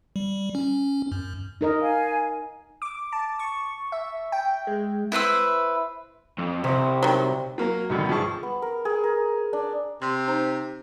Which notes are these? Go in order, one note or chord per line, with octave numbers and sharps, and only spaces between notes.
G3
C#4
F#2
D#4 A#4 D#5
F5 G#5
D6
A5
C#6
E5
G5
G#3
E4 B4 C5 E5
F2
C2 C3
D#3 F#3
F#3 A#3 A#4 A#5
C#2 F#2 B2 D3 D#3
G2 F3 G#4 A5 C#6
B3
A#4
G#4
A#4
D4
C3 C6
D#4 C5 A#5